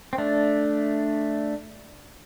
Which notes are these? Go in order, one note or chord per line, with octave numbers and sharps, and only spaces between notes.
C4
A3 D4